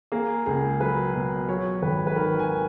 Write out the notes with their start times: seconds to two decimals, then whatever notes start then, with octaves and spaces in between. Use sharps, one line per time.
0.12 A#3 G#4
0.46 C#2 G#4
0.81 F#3 B4
1.14 B2
1.49 F#3 C#5
1.82 G#1 B4
2.07 B4
2.16 D#3 A#4
2.39 G#5